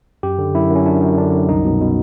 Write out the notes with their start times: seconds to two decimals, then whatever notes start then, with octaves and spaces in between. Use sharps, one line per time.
0.23 F#2 G4
0.39 D3
0.55 F#2 E4
0.70 F#2
0.75 C#4
0.86 F#2 D4
1.02 F#2
1.18 D3 D4
1.33 F#2
1.49 C2 D#4
1.65 B2
1.81 B2